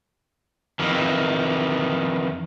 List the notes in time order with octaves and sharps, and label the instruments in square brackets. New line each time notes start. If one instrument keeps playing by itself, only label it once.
[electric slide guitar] F2 D#3 E3